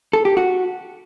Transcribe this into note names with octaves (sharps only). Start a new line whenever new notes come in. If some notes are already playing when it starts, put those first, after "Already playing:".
A4
G4
F#4